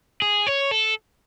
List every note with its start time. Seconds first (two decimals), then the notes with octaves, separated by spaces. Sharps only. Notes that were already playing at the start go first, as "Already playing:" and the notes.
0.22 G#4
0.47 C#5
0.71 A4